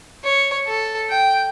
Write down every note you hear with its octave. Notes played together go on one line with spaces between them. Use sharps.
C#5
A4
G5